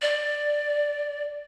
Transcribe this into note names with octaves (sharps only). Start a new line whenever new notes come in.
D5